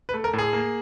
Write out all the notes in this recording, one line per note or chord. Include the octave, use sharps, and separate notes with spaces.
B4
A3
A#4
A2
G#4
A#3